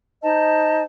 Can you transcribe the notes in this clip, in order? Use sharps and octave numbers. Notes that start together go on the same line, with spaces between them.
D#4 C5 D#5 A5